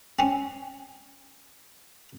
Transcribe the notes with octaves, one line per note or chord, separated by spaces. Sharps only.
C4 C#4